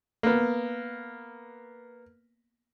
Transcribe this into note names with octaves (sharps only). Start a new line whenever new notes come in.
A#3 B3